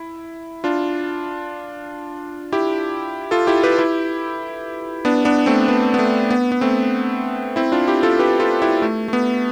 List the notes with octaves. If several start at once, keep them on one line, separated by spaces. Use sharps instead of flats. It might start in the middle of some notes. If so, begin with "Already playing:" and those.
Already playing: E4
D4 F4
E4 G4
F4 A4
E4 G4
G4 B4
E4 G4
B3 D4
B3 D4
A3 C4
B3
B3
A3
B3
B3
A3 C4
C4 E4
D4 F4
E4 G4
F4 A4
G4 B4
F4 A4
E4 G4
A3
A3
B3